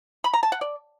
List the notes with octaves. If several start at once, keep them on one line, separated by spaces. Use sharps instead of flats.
B5
A#5
A5
F#5
D5